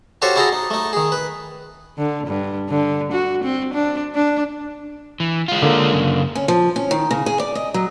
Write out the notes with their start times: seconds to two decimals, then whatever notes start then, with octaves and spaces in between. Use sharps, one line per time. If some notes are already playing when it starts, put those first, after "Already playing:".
0.22 F#4 G4 A4 C5 C#5 F5
0.36 E4 F#4 G#4 A4 G5 A#5
0.53 D#4
0.70 A3 D#4
0.93 D#3 G#4
1.12 B4
1.98 D3
2.28 G2
2.69 D3
3.12 F#4
3.44 C4
3.74 D4
4.15 D4
5.20 E3
5.48 G#3 F4
5.62 D3 A#3
5.93 F#2 C#3
6.35 C#4
6.48 F3
6.76 C#4
6.91 D#3
7.11 C#3
7.26 G#4
7.40 D5
7.55 D#5
7.74 F#3